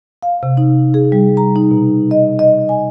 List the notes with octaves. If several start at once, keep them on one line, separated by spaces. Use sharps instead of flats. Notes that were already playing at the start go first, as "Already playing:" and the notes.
F5
C3
D#4
G#4
G3
A#5
D#4
B2
D#5
D#5
G#5